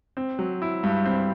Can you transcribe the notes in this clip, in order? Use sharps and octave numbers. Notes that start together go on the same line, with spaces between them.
C4
F#3
E4
G2
C4